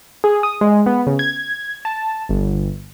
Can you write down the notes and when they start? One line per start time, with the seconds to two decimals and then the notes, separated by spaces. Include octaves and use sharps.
0.24 G#4
0.43 D#6
0.61 G#3
0.86 B3
1.07 C#3
1.19 G#6
1.85 A5
2.29 G1